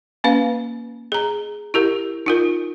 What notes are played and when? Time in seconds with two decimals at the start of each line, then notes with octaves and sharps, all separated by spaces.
0.24 A#3 C#4 B4 F5
1.12 G#4 A#5
1.74 E4 G4 A#4
2.26 D#4 F4 A#4